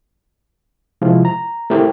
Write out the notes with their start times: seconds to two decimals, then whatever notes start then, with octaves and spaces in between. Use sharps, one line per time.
1.02 C3 F3 G#3 E4 F4
1.25 A#5
1.70 A3 C4 E4 G4 A#4